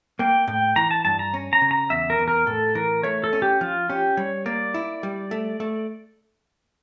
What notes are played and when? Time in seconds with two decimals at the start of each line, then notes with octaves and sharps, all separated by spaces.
0.19 A#3 G5
0.47 A2 G5
0.76 E3 A#5
0.91 A5
1.05 G2 A5
1.19 A#5
1.34 C#4
1.53 A#5
1.62 C#3
1.71 A#5
1.90 E2 E5
2.10 A#4
2.19 E2
2.28 A#4
2.47 A2 A4
2.75 E3 A#4
3.03 A3 C#5
3.24 A4
3.33 C#4
3.42 G4
3.61 F3 F4
3.90 C#4 G4
4.17 G3 C#5
4.46 A#3 D5
4.74 E4
5.03 G3
5.31 A3
5.60 A3